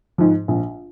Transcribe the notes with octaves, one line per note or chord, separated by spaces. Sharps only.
G#2 F3
A#1